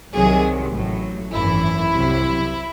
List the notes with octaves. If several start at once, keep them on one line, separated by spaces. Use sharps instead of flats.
C2 C3 D#3 F#3 G#4
A1 A2 F#3
G#1 F#2 E3 E4
C2 C3 F#3